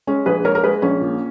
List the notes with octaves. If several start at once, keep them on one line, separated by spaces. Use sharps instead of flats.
G#3 C#4
A#1 G#4 B4
G#3 A#4 C#5
A#4
G#3 G#4 B4
A#1 C#4
A#2